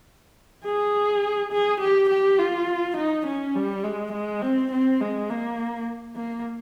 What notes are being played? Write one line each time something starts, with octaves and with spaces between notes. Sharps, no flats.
G#4
G#4
G4
G4
F4
D#4
C#4
G3
G#3
G#3
C4
C4
G#3
A#3
A#3